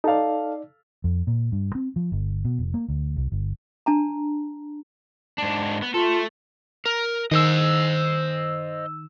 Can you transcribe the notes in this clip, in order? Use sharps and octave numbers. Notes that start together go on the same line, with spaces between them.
D#4 A4 D5 F5
F2
A#2
G2
C4
F3
G1
B2
F1
A#3
D2
C2
G1
D4 A5 A#5
G#2 D4
B3
A3 F4 A4
A#4
D#3 C5 D#5 E6